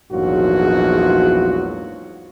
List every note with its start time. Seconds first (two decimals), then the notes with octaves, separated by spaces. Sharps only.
0.11 A#1 E2 G#2 F#3 F4 F#4